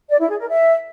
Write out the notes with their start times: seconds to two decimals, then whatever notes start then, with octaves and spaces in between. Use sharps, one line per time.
0.10 D5
0.20 E4
0.30 G#4
0.39 A#4
0.49 E5